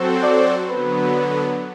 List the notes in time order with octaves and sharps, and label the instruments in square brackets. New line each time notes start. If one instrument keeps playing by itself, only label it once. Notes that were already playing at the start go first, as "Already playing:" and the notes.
Already playing: [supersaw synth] F#3 C4 F#4 A4 C5
[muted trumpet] D5
[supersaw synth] D3 F#3 B3 [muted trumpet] B4